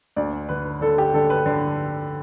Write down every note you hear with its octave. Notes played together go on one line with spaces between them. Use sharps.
D2 D5
D3 B4
D3 A4
G4
D3 A4
B4
D3